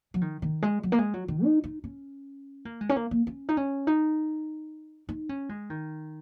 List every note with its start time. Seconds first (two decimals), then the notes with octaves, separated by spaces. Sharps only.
0.14 F#3
0.21 D#3
0.42 D#3
0.62 G#3
0.83 F#3
0.92 A#3
0.99 G#3
1.14 F#3
1.28 D#3
1.44 D#4
1.64 D#4
1.84 C#4
2.65 A#3
2.81 G#3
2.89 C#4
2.96 A#3
3.11 A#3
3.27 C#4
3.49 D#4
3.57 C#4
3.87 D#4
5.09 D#4
5.29 C#4
5.49 G#3
5.70 D#3